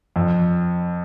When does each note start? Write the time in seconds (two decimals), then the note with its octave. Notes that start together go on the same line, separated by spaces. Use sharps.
0.16 F2